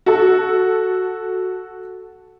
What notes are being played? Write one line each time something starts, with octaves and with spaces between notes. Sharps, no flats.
F#4 A4